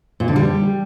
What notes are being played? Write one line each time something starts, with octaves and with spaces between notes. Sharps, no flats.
A#2
D3
G3